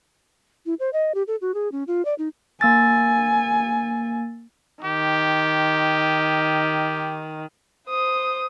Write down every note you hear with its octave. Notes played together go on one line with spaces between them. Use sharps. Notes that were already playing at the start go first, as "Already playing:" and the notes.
E4
C5
D#5
G4
A4
F#4
G#4
C#4
F4
D5
D#4
A#3 G#5 E6 A6
D#3 G4
C5 D#6